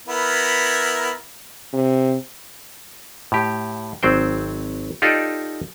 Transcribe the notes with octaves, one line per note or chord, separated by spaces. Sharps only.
B3 E4 A#4
C3
A2 G4
G#1 F#3 C4 C5 G5
D#4 F4 G4 A4 D5 D#5